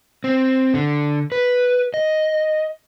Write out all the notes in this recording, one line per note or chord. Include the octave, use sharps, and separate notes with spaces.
C4
D3
B4
D#5